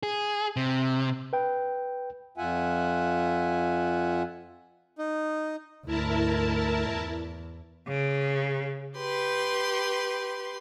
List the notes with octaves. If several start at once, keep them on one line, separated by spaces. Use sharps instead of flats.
G#4
C3
B4 G5
F2 F4 E5 F#5 G#5
D#4
D2 G#2 E4 A#4 A5
E2
C#3
G4 B4 C6